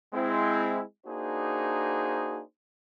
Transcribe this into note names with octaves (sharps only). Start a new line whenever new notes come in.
G#3 C4 E4
A#3 D4 D#4 F#4 G#4 C5